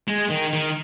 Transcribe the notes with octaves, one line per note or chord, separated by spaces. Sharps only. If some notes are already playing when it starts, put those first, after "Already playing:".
G#3
D#3
D#3